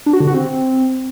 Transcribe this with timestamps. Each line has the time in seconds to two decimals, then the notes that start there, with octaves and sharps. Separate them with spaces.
0.06 D4
0.13 F#4
0.20 D3
0.27 F#4
0.34 C4